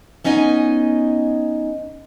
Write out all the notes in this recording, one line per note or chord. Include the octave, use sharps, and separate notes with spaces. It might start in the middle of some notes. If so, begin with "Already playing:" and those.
B3 C#4 D#4 D#5 G#5